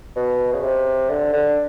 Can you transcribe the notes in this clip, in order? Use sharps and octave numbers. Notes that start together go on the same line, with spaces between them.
B2
C#3
C3
D3
D3